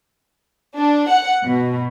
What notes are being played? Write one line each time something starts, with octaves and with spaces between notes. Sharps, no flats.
D4
F#5
B2